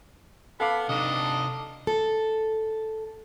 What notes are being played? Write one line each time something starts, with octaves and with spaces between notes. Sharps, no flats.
B3 A4 F5 B5 D6
C3 D4 D#4 D#5
A4